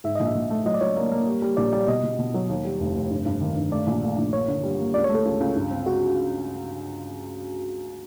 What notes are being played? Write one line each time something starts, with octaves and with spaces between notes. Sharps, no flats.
G#2 E5
A#1 D#5
E5
A#1
A3
F#3 D#5
D5
F#3 C#5
A#3
A#3
G3
G3
A#1 D5
G3 D5
B2 D#5
B2
B2
F#3
D#2
G3
F1
F1
G2
G2
D#3
G2
A3 D5
A#1
A3
A#1
A#3 C#5
D3
G3
A#3
C#2 D5
C#5
A3
A4
C#2
C#2
G2
C4
G#3 F#4